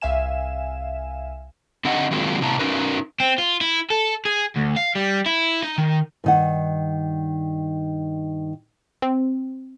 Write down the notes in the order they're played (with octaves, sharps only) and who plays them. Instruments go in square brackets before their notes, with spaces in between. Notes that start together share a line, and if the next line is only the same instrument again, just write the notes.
[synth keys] C2 E5 F5 G#5 E7
[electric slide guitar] D3 C4 D#4 D#5 F#5
D#3 F#3 G#3 A#3 C4 F4
A2 C3 B3 E4 A5 A#5
C#4 D#4 F#4 A#4 B4
[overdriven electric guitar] C4
F4
E4
A4
G#4
D2
F5
G3
E4
D#4
D#3
[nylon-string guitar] G2 D#3 F#5
[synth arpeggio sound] C4